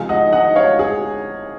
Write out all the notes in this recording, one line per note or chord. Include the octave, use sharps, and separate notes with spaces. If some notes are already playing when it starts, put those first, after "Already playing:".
Already playing: C3 F3 G#3 F5 G#5
D#5 F#5
D#5 F#5
C#5 F5
G#4